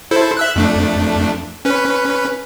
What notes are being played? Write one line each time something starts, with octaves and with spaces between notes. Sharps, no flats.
E4 A4 C5
E5 E6 F#6
F2 A3 D4
C#4 B4